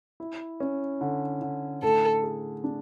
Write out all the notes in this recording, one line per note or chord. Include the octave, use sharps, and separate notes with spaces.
E4
C#4
D3
D3
A2 A4
G#4
D4